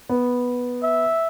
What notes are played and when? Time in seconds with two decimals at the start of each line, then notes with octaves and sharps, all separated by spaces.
0.09 B3
0.83 E5